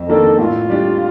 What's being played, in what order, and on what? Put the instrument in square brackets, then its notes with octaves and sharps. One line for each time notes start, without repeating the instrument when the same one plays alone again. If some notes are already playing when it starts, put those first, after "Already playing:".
Already playing: [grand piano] F2
[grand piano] D#3 A#3 D4 [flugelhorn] A4
[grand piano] A2 [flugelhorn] F4
[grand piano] G3 D4